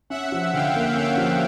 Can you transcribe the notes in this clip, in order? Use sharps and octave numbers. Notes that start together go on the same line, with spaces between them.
C#4 E5 F#5
F3
D3 F5 G5
A#3
C#4 F5 G5
F3